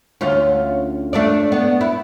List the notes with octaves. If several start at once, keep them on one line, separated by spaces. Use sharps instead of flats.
D2 C#4 F4
A3 D4 D5
B3
E4